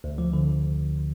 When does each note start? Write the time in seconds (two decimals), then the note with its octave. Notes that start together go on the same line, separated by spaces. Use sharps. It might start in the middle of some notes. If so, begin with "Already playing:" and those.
0.04 D2
0.18 F3
0.33 D3